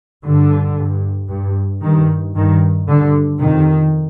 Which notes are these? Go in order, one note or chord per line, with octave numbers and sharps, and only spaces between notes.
G2 D3
G2
G2
G2 D#3
G2 D#3
G2 D3
F2 C3 D#3